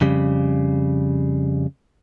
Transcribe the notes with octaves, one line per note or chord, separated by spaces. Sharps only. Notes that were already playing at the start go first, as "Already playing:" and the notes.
F2 C#3 G3